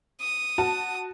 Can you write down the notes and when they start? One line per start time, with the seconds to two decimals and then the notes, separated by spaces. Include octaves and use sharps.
0.21 D#6
0.58 F#4 A5